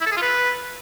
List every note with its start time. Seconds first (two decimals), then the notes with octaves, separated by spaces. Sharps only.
0.01 E4
0.06 A4
0.12 G#4
0.17 F4
0.22 B4